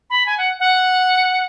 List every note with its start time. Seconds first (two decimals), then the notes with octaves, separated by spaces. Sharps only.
0.10 B5
0.26 G#5
0.38 F#5
0.60 F#5